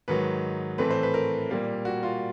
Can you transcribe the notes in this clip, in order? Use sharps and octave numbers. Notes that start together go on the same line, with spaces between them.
G#2 D#3 F#3 B4
A2 E3 A3 C4 B4
C5
B4
A#4
A#2 G3 A#3
F#4
F4